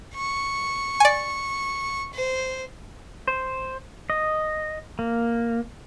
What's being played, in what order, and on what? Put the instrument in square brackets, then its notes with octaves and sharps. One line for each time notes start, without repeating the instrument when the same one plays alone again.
[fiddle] C#6
[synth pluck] D5 G#5
[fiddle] C5
[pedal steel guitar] C5
D#5
A#3